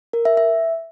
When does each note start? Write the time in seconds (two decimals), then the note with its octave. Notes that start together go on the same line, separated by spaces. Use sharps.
0.13 A#4
0.25 E5
0.37 E5